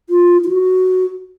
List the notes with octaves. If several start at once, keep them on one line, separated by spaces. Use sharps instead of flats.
F4
F4
F#4